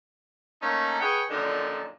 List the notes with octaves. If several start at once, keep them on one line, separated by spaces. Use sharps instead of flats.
A3 A#3 C#4 D#4
G#4 B4 C#5 F#5 G5
F#2 A#2 D3 D#3 F3